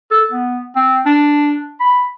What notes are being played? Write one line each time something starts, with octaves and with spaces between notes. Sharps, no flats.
A4
B3
C4
D4
B5